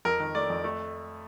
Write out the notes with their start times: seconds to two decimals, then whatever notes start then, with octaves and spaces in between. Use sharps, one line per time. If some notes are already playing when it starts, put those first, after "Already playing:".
0.05 F2 A#4
0.20 D#3
0.35 A3 D5
0.50 F2
0.64 A3